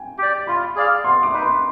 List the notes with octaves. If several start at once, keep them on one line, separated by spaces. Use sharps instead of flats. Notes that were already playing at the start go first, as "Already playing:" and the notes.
Already playing: G5 G#5
G4 D5
F4 B5
G#4 D5 F5
B3 C6
D6
D#4 B4 B5
C6